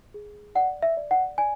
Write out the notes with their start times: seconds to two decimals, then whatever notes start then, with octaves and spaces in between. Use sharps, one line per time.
0.14 G#4
0.55 D5 F#5
0.82 E5
0.97 D5
1.11 F#5
1.38 D5 G#5